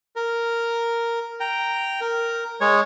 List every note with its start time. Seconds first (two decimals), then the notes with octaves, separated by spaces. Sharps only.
0.16 A#4
1.40 G5 A#5
2.01 A#4
2.61 G#3 C#5